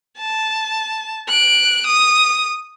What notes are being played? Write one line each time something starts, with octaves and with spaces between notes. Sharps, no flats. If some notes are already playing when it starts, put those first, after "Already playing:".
A5
F#6 D7
D#6